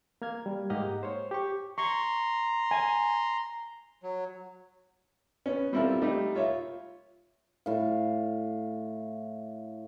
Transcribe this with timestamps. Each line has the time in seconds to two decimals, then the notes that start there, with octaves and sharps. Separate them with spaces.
0.22 A#3 F6 G#6
0.46 G3
0.70 G#2 A#3 G4 D#5 F#5 F6
1.03 C5 C#5
1.31 G4 C#6
1.78 A#5 C6 C#6
2.71 G#5
4.03 F#3
5.46 B3 C#4
5.73 G3 C4 E4 F4 A4 A#4
6.01 G3 A3 A#3 D#4 G4
6.35 F4 C#5 E5
7.66 A2 F5